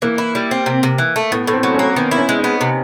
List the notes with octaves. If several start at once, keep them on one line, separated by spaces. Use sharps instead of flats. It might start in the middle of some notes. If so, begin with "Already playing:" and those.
E3 A#3
E4
G3
C4
C3
C3
E3
A3
A2 B3
A2
C4
F#3
A#3 C#4
D#3 B3
E4
C#4
G#3
D#4
B3
C3